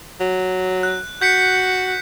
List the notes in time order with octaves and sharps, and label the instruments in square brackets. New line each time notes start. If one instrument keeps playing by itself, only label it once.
[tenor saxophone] F#3
[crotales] F#6
[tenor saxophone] F#4 [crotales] G6 B6 C#7